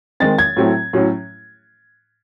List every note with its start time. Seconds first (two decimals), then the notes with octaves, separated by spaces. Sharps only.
0.20 D#3 G#3 C4 A6
0.39 G#6
0.57 A2 F#3 A3 C4
0.93 A2 F#3 C#4